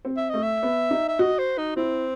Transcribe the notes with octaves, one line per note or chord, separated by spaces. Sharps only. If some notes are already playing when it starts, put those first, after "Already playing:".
C4
E5
A3 D#5
E5
B3
D#4
E5
F#4 D#5
C5
D#4
C4 E4